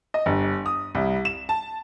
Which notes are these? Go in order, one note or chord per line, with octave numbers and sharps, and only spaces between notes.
D#5
G1
D#6
C2
E7
A5